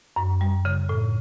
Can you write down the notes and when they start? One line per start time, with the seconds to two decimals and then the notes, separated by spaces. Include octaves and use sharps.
0.16 F#2
0.41 G3
0.65 C#3
0.89 A2